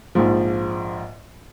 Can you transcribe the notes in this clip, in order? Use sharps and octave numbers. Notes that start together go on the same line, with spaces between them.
A#1 G#2 F3